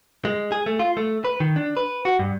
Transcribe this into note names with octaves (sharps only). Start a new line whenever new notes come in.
G#3
G#4
A3
F4
A3
B4
D#3
D4
B4
F#4
G2